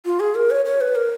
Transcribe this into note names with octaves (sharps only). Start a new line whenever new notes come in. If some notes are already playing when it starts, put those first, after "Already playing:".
F4
G#4
A#4
C#5
C#5
B4
A#4